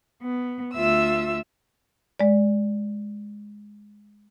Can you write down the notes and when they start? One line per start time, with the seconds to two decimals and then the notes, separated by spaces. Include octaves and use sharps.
0.22 B3
0.74 D2 F4 E5 E6
2.20 G#3 D5